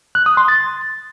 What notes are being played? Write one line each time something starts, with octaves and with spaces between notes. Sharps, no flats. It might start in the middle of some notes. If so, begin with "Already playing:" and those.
F#6
D#6
C6
A6